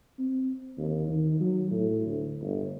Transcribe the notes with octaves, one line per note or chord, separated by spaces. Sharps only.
C4
D#2
D#3
F#3
A2
D2
G1